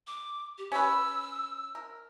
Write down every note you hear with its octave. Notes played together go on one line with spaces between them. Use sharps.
D6
G4
C#4 B4 E6
A#4